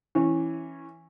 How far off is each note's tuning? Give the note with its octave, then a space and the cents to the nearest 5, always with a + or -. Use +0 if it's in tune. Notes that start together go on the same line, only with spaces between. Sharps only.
E3 +0 C#4 -15